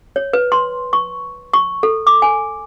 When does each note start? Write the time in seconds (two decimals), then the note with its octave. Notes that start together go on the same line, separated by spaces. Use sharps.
0.16 C#5
0.33 B4
0.52 C6
0.93 C#6
1.53 C#6
1.83 A4
2.07 D6
2.22 G#5